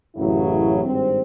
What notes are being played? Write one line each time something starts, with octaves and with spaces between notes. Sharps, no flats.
A1 F#2 C#3 F#3 E4
G#1 G2 C4